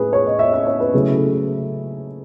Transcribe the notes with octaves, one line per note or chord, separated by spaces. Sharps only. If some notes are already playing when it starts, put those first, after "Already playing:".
Already playing: A2 G#4 B4
C#5
D#5
E5
E5
C#5
B4
C#3 F#3 A3 C#4 E4 G#4
A4